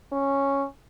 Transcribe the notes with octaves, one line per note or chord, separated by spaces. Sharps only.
C#4